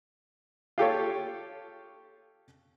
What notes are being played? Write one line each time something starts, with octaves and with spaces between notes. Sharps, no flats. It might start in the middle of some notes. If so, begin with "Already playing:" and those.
F4 G4 A4 C#5